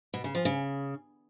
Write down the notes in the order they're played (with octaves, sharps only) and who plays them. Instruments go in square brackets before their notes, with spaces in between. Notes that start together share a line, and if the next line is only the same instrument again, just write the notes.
[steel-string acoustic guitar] B2
C#3
F3
C#3